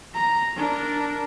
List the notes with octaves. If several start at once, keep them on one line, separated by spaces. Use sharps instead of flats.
A#5
D4 A#4